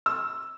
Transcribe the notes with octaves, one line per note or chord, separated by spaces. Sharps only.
E6